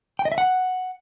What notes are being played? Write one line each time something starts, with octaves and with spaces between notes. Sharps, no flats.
G5
D#5
E5
F#5